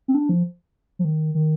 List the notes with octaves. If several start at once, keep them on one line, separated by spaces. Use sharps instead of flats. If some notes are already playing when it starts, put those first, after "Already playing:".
C4
D4
F3
F3
D#3
D#3